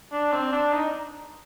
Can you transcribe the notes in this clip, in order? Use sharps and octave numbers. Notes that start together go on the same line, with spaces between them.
D4
C4
D4
D#4